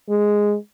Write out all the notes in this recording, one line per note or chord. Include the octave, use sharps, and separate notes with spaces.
G#3